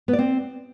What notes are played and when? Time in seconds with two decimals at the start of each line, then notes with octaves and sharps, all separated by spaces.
0.08 B3
0.13 D5
0.19 C4